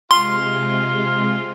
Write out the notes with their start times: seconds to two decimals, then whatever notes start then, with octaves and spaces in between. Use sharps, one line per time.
0.11 C3 G#3 F4 C6